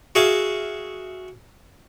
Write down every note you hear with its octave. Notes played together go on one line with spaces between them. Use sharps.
F#4 G#4 E5 F5